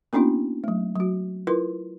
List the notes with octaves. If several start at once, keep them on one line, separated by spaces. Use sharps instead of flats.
A#3 B3 C#4 D4 E4 F#4
F#3 A3
F#3 F#4
E4 F4 A#4 B4 C6